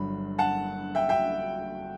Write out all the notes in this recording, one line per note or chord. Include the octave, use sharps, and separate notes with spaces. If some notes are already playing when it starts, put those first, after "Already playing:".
Already playing: G1 G2 F#3 B5
F#5 A5
E5 G5
E5 G5